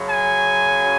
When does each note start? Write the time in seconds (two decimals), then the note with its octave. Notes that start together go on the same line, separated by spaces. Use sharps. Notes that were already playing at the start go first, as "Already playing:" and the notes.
Already playing: F#2 C#3 F#3
0.09 G#5